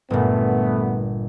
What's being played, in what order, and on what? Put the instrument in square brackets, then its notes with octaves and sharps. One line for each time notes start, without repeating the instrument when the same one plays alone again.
[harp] G1 A#2 [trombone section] A3 B3